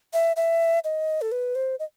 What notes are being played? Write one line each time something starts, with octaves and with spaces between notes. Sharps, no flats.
E5
E5
D#5
A4
B4
C5
D#5